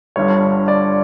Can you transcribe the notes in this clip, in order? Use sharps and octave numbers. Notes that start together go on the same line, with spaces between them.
G1 G2 D3 G3 C#5
D5